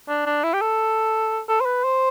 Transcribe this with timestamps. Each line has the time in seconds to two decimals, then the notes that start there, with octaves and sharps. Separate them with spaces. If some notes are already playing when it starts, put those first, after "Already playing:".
0.08 D4
0.26 D4
0.43 E4
0.54 G4
0.61 A4
1.49 A4
1.60 C5
1.65 B4
1.84 C5